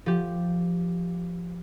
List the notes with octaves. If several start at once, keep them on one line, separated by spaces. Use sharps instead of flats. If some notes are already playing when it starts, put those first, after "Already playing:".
F3 G4